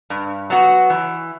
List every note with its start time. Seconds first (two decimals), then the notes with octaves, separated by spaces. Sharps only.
0.10 G2
0.50 F#3 B3 F#4
0.90 E3